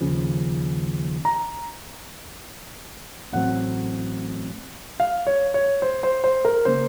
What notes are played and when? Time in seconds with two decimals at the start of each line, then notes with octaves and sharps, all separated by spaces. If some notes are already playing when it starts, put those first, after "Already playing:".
0.01 D#2 C#3 F3
1.25 A#5
3.33 A1 A2 F#3 C4 F#5
5.00 F5
5.27 C#5
5.54 C#5
5.82 C5
6.03 C5
6.24 C5
6.45 A#4
6.65 C#3 F#3 A#3 C5